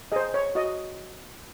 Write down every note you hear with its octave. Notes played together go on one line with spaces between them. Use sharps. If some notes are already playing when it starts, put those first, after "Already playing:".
G#4 C5 D#5
C#5
F#4 D#5